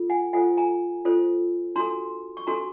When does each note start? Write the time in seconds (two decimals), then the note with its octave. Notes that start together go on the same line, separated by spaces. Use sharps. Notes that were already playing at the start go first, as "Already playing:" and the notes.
Already playing: F4 A4
0.10 F#5 G#5
0.33 F4 A4 C5 F#5 G#5
0.57 G#5 A#5
1.05 F4 A4 C5
1.76 D4 F#4 A4 A#5 C6
2.37 C#6
2.47 D4 F#4 A4 A#5 C6